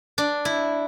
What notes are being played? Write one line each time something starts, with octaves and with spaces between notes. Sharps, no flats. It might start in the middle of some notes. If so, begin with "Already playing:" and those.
D4
E4